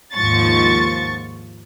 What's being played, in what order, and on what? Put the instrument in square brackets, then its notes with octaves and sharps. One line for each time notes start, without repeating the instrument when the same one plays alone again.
[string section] D#2 G#2 F3 C#6 A6